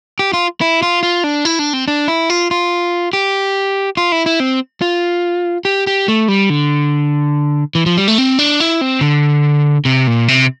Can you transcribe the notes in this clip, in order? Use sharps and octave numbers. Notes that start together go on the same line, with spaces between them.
G4
F4
E4
F4
F4
D4
E4
D4
C4
D4
E4
F4
F4
G4
F4
E4
E4
C4
F4
G4
G4
A3
G3
D3
E3
F3
G3
A3
C4
D4
E4
C4
D3
C3
A#2
C3